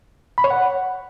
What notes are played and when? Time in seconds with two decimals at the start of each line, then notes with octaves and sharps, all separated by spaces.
0.38 B5
0.44 C#5
0.51 F#5